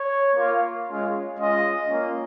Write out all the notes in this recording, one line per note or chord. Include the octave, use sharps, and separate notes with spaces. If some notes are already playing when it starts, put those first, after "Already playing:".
Already playing: C#5
A#3 F4
G#3 C#4 F4
G#3 C#4 F4 D#5
A#3 C#4 F4